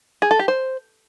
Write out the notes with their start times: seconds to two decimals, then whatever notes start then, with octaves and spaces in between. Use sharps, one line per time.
0.22 G#4
0.31 A4
0.39 G4
0.48 C5